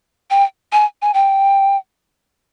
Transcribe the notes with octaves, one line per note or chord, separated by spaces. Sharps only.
G5
G#5
G#5
G5